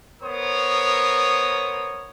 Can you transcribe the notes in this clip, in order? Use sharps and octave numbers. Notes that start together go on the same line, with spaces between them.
B3 A#4 C5 C#5 D#6